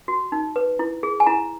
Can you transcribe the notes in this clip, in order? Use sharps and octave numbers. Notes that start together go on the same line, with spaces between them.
F#4
D#4
B4
E4
G#4
G#5
E4 A#5